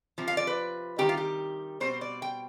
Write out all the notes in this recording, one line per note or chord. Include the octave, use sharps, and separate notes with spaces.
C3 F3
F5
D5
B4
C3 D#3 G3 G4
F4
G4
B2 G3 C4 C5
D5
G5